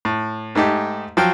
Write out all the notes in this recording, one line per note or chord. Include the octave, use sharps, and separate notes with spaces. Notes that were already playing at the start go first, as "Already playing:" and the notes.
A2
G#2 A3 D#4 G4
F3 F#3 G5 F6